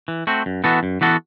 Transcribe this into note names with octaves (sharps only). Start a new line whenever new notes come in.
E3
A3 C4 F#4
F#2
E3 B3 F#4 A4
F#2
E3 B3 F#4 A4